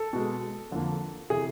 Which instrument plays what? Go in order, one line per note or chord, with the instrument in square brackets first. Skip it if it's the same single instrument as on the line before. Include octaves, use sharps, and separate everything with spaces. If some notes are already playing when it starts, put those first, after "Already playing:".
Already playing: [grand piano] A4
B2 G#3
F2 D3 F3 A#3
C3 E3 G#4